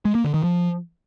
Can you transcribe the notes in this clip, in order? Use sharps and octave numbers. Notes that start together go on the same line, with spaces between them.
G#3
A#3
D3
D#3
F3